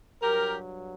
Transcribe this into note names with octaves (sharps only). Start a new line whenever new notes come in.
G2 F#3 G4 A#4